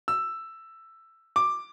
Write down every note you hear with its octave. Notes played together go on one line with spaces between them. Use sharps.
E6
D6